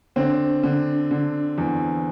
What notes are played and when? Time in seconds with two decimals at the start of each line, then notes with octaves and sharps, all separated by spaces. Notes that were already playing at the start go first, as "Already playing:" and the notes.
0.16 D3 C4
0.63 D3
1.11 D3
1.58 E2